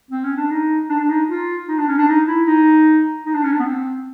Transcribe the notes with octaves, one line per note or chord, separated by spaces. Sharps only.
C4
C#4
D4
D#4
D4
D4
D#4
F4
D#4
D4
C#4
D4
D#4
E4
D#4
D#4
D4
C#4
D4
B3
C4